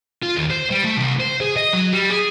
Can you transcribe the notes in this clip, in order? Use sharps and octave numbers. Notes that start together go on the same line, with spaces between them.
F4
D#2
C5
G3
A3
C2
C5
G#4
D#5
F#3
G3
G#4